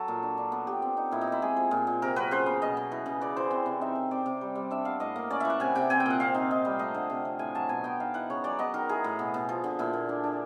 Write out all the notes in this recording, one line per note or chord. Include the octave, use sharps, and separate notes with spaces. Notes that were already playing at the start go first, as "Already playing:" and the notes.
Already playing: F#3 A4
A#2
D4
D4
B3 A4
B3 G4
C4
D#4
A#2 E4
D#4
C4 E4
G#3 G#4
F3
A#2
A#2
C3 A#4
F#3 B4
C#3 C5
B3
B2 D#5
B2
E3
C#3
E3 D5
E3 C5
C4
C3
D#4 E5
D#3
C4 D5
C3
G3
G3
D4 E5
B3 F5
A2 D#5
A#3
C#4 D5
E3 E5
F#5
C3 G#5
C3 G5
C4 G#5
G5
A#2 F#5
C4 F5
D#4
D#4
G3
A3 D#5
D3
C3
F3
A2 G#5
F#3 A5
B2 G#5
B3 G5
D#4 F5
E3 F#5
C#3 C#5
F#3 D5
B3 D#5
D#3 A#4
E3 G#4
A2
B2
B2
F3
D3
A#2 E4
A#2
D4
D4